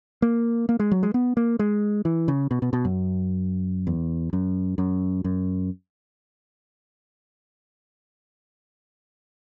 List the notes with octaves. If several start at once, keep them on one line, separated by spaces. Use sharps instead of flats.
A#3
A#3
G#3
F#3
G#3
B3
A#3
G#3
E3
C#3
B2
B2
B2
F#2
E2
F#2
F#2
F#2